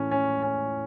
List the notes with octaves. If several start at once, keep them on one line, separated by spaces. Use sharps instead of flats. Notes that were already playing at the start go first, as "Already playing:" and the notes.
Already playing: A2 E3 C#4
C#4
C#4